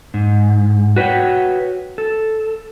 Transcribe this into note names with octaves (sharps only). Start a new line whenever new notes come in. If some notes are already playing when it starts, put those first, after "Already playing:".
G#2
F#4 B4 C#5 F#5 G5
A4